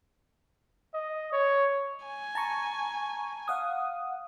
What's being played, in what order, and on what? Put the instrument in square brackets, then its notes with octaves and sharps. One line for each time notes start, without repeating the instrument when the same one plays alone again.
[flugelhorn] D#5
C#5
[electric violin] G#5
[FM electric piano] A5 A#5 C#6
F5 F#5 D#6